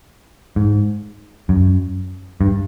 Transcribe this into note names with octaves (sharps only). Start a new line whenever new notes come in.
G#2
F#2
G2